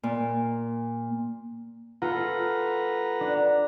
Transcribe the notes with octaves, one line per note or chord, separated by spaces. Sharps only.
A#2
F4 A4 B4 F#5 A#5
D4